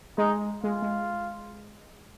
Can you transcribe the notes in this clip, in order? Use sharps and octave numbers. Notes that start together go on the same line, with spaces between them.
G#3 D#4
G#3 F4
G#3